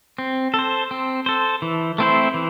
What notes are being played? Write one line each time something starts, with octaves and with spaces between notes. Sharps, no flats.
C4
A4
C5
C4
A4 C5
E3
A3 C4 E4 C5
E3